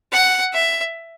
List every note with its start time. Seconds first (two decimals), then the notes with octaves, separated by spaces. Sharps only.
0.12 F#5
0.53 E5